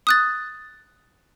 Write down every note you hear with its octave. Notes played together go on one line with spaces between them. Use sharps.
D#6 F#6 A6